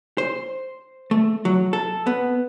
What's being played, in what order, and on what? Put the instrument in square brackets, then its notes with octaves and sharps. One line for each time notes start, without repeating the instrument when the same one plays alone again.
[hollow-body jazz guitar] C5
A3
F#3
A4
B3